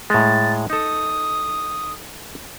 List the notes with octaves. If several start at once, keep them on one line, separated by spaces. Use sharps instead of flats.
A2 G#3 A6
D#4 A4 D#6